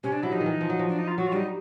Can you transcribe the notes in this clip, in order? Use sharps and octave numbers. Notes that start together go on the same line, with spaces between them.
C3 C#4
D4
F#3 E4
F3 D#4
D#3
E3
F3
F#3
F3
D4
D#4
F4
F#3 F#4
F4
G3 D4 D#4